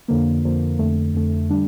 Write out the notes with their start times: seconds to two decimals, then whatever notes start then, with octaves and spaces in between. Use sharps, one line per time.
0.08 F2 D3 F3 A#3
0.43 F2 D3 F3 A#3
0.79 F2 D3 A3
1.14 F2 D3 A3
1.49 D3 G3 D4